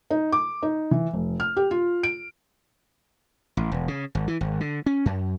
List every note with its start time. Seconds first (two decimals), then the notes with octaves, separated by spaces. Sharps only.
0.11 D#4
0.32 D6
0.63 D#4
0.91 E3
1.13 F1
1.40 F6
1.57 G4
1.71 F4
2.03 D7
3.57 A1
3.72 E1
3.88 C#3
4.15 G#1
4.28 E3
4.41 G#1
4.60 D3
4.86 C#4
5.06 F#2